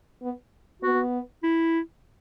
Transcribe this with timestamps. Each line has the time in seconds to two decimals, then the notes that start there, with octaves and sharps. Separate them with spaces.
0.22 B3
0.82 B3 F#4
1.43 E4